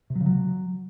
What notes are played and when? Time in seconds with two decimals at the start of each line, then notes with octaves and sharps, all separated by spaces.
0.10 C3
0.15 F#3
0.21 C#3
0.26 F#3